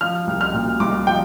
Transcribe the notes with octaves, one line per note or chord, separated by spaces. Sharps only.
F3 F6
C2
F6
A#2
C2 D6
F3 G5